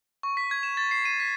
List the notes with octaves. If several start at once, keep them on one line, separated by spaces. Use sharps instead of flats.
C#6
B6
G#6
E7
A6
C7
D#7
B6